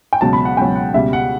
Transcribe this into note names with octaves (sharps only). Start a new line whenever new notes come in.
G5
C#2 B2 F#3 A5
B5
F#5
C#2 B2 F#3 G5
F#5
C#2 B2 G3 E5
F#5